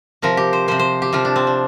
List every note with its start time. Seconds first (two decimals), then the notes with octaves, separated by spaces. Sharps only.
0.22 C3 F3 A#4
0.37 G4
0.53 C5
0.68 C3 F3 C5
0.79 C5
1.02 G4
1.13 C3 F3 F4
1.25 D4
1.36 C4
1.47 D4